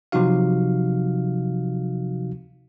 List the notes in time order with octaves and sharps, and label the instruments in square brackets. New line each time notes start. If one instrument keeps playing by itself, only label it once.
[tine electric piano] C3 F3 F#3 D#4 F#4 F5